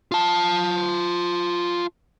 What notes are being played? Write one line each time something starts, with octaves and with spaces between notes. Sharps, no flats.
F4 A5